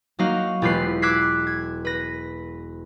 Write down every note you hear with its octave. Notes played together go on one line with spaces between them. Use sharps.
F#3 A#3 D#4 F#4 F5
E1 F4 G4 B4 C7
D6 E6 F#6 G#6 B6 C7
G#6
B4 A#6